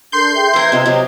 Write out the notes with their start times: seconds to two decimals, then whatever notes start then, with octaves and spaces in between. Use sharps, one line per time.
0.12 D4 A4 A#4 C6 G6
0.35 G#4 E5 G5
0.53 F3 A#4 B4 E6 G#6
0.72 C3 F4 D#5
0.86 C3 F#3 D#5